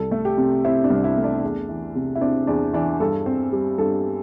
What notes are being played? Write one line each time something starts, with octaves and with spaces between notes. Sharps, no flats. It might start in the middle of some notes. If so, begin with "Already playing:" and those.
Already playing: C2 A4
A3
G4
C3
C4 E4
D4
C2
E4
A3
D4
E2
E3
C3
E4
C4 D4
E2 D4
E3 D4
G2 A4
C4
G3
G2 A4